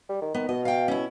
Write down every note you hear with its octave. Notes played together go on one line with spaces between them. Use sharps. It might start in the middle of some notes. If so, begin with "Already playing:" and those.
G3
D#3
D#3 B3
B2 D#5
F5 G5
C#4 E4